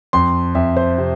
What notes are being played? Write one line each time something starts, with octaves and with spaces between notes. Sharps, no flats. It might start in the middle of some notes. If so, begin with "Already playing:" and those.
F2 C6
F2 E5
C5
C3